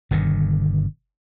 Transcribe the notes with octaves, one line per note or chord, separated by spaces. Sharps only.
G1 B2 D3 D#3